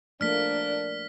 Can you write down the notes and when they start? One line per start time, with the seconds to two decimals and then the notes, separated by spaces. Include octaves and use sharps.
0.21 F3 A3 A#3 D4 F6 B6